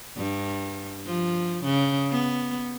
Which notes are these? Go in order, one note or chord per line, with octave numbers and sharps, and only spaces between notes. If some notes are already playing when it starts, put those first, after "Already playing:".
G2
F3
C#3
B3